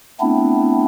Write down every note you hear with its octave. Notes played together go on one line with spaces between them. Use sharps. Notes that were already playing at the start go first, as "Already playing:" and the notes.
A3 B3 C4 D4 E4